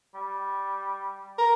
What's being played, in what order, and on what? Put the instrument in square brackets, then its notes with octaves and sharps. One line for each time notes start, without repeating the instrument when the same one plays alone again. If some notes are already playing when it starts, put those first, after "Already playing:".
[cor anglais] G3
[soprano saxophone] A#4